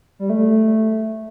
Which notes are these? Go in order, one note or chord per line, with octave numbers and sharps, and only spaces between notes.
G3
A3